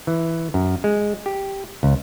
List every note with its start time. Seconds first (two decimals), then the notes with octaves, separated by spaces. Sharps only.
0.07 E3
0.54 F#2
0.84 G#3
1.26 G4
1.83 C#2